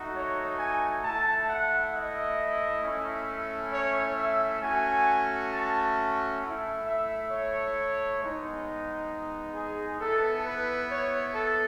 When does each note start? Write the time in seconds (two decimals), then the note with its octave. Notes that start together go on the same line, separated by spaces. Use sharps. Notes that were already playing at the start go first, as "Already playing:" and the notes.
Already playing: A3 D#4 F#4
0.14 C#5
0.59 G#5
1.03 A3 E4 A5
1.48 F#5
1.93 D#5
2.82 A3 C#4 E4
3.73 C#5
4.17 E5
4.62 A3 C#4 F#4 G#5
5.52 A5
6.42 A3 E4
6.86 E5
7.31 C#5
8.21 G#3 B3 D#4
9.55 G#4
9.99 B3 E4 A4
10.45 B4
10.89 C#5
11.34 A4